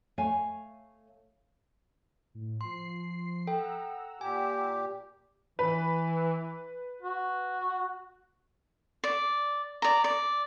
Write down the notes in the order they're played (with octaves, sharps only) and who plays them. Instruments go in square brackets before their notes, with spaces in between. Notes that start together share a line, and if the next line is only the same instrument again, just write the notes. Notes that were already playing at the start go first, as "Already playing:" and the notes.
[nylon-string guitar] A3 C#5 F5 G#5
[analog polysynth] A2
[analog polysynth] F3 C7 [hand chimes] C6
[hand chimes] A4 G5 [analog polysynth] F#5 A#5 E6
[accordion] A#2 G4 [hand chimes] G#5
[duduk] E3 [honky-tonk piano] B4
[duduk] F#4
[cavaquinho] D5
D5 A#5
D5